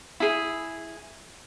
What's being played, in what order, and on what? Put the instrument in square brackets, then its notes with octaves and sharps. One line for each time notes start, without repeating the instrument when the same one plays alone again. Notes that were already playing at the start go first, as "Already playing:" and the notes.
[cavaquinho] E4 G#4